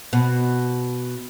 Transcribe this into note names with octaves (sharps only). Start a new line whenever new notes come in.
B2